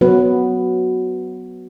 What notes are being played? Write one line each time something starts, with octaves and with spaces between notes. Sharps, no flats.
F#3 B3 F#4 B4